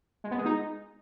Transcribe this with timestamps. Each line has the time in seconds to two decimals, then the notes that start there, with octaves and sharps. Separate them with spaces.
0.24 G#3
0.31 B3
0.38 G#3
0.45 D#4